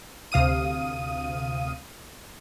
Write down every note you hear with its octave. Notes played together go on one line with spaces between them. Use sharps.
D2 C3 F5 D#6 D#7